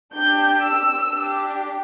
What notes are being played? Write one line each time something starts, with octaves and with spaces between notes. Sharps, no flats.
D4 G4 G6
E6
D4 G4